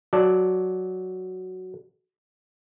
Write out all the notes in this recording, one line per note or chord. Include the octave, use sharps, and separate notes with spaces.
F#3 D5 A5